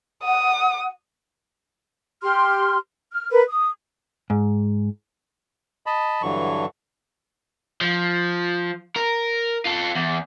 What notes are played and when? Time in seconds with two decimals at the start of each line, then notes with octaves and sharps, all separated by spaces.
0.23 F#5 D#6
2.22 G4 C6 F6
3.12 F6
3.31 A#4 B4
3.48 D#6
4.30 G#2
5.86 D#5 A5 B5
6.22 G2 D3 E3 F#3 C#6
7.81 F3
8.96 A#4
9.66 F4 A4
9.96 E2